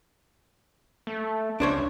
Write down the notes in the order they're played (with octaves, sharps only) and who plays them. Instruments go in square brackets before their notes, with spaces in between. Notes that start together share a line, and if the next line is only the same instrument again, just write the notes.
[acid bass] A3
[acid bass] C#2 [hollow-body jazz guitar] D4 C5 C#5